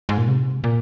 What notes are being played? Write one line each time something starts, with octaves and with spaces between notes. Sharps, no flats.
G#2
A#2
C3
A#2